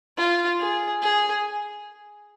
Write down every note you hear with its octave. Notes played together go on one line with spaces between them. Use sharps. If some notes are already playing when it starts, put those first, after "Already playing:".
F4
G#4
G#4